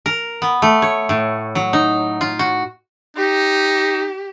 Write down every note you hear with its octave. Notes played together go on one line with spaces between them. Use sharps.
A#4
B3
A3
C#5
A2
F#3
D#4
F4
F#4
D#4 G4